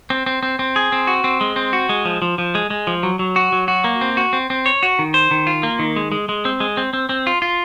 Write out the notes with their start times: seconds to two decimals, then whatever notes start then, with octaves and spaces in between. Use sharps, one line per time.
0.10 C4
0.26 C4
0.43 C4
0.59 C4
0.76 G#4
0.92 C4
1.07 F#4
1.24 C4
1.41 G#3
1.56 C4
1.73 F#4
1.89 G#3
2.05 F3
2.22 F3
2.38 F3
2.55 G#3
2.70 G#3
2.87 F3
3.03 F#3
3.19 F#3
3.36 F#4
3.52 F#3
3.68 F#4
3.84 A#3
4.01 C4
4.17 F#4
4.33 C4
4.50 C4
4.66 C#5
4.83 F#4
4.99 D#3
5.14 C5
5.31 D#3
5.47 F4
5.63 A#3
5.79 D#3
5.96 G#3
6.12 G#3
6.29 G#3
6.45 C4
6.60 G#3
6.77 C4
6.93 C4
7.09 C4
7.27 F4
7.42 F4